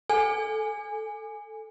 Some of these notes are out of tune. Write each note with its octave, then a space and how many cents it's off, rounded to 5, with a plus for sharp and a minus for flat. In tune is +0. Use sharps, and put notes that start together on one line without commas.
A4 +0 G#5 +0